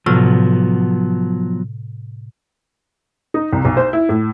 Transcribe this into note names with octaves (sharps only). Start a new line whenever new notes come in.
A2 C3 F3 F#3 B3 F6
D#4
C2
B1
C5
E4
A2